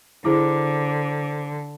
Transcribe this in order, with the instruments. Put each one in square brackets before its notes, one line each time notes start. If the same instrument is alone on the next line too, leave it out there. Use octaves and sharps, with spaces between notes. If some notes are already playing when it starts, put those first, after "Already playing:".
[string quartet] D3 [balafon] E4 G#4 [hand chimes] C5 A#5 D6